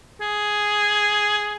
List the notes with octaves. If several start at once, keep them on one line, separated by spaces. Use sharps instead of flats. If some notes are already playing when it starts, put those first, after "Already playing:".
G#4